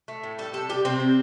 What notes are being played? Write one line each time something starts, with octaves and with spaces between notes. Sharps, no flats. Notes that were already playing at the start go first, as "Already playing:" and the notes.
A3
A2
G3 A4
C3 A4
G3 G4
C3 C4
G3